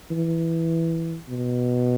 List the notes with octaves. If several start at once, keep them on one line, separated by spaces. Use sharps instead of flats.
E3
B2